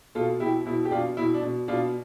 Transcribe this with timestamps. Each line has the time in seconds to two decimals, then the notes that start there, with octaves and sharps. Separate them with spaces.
0.15 B2 F4 A4
0.40 B2 E4 G4
0.65 B2 E4
0.85 G4
0.91 B2 D4 F4
1.17 B2 E4
1.34 D4
1.42 B2
1.68 B2 D4 F4